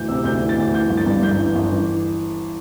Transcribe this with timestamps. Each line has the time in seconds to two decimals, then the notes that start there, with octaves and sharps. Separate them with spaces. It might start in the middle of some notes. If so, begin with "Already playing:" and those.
Already playing: D2 E3 G6
0.08 C3 E6
0.24 D2 G6
0.41 E3
0.49 A6
0.58 D2
0.74 E3 G6
0.89 G1
0.97 A6
1.06 G2
1.23 G1 G6
1.38 E3
1.55 G1
1.72 E3